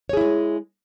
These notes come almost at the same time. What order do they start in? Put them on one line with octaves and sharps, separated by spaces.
C#5 G#4 E4 G#3